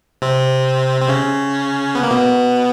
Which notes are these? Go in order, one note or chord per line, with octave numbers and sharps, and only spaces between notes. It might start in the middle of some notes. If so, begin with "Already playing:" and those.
C3 C4
C4
C#3 C#4
B3
A#3
B2 B3